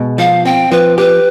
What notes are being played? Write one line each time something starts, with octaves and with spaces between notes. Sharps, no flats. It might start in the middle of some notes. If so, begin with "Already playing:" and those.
Already playing: B2 G#3
F3 F5
C4 G5
F3 B4
G4 B4